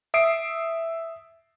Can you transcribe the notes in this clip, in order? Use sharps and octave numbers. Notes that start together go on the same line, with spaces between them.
E5 D#6 C7 D7